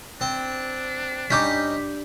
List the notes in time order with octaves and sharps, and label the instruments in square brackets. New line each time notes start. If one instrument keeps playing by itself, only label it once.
[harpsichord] C4 [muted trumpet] D4
[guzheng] G2 G3 [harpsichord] C#4 D#4 [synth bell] D6 G6 B6